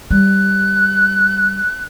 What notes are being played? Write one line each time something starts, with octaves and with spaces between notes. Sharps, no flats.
G3 F#6